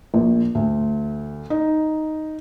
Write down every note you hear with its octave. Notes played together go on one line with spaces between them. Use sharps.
A#1
D2
D#4